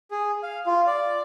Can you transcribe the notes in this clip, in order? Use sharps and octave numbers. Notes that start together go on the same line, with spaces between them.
G#4
F5
F4
D5